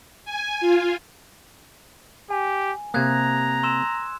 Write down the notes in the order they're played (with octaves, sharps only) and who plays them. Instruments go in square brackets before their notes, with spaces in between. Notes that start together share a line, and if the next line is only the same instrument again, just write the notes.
[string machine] G#5
F4
[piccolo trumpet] G4 [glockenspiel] G#5
[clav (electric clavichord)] C3 A#3 [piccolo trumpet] A#5 [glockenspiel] D#6 F#6 G#6
[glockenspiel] C6 E6 E7